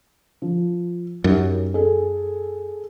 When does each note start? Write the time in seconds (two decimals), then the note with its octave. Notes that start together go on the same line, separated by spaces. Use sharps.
0.42 F3
1.24 F#2 D#4 G4
1.74 G#4 A4